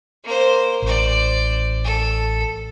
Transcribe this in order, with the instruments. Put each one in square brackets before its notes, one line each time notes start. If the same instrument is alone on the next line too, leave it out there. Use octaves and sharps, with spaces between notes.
[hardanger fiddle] A#3 C5
[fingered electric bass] A1 [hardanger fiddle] C5 D5
[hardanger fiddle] A4